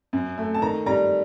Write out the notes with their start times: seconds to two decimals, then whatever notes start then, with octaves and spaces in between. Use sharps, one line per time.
0.13 F#2
0.38 A3
0.54 A5
0.62 D#3 A#5
0.86 G3 A#5